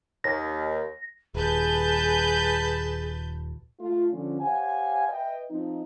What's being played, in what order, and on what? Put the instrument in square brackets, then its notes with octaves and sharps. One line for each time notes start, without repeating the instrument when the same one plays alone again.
[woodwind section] D#2 [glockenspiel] A#6
[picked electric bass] D#1 [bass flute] G#4 [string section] B4 A5 G6
[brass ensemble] A3 F4
D3 F3 C#4
G4 C5 C#5 F5 F#5 G#5
B4 D#5 E5 G5
F3 C4 D#4